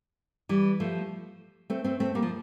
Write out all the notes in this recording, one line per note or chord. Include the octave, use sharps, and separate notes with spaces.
E3 G3
F3 A3
A3 C4
A3 C4
A3 C4
G3 A#3
F3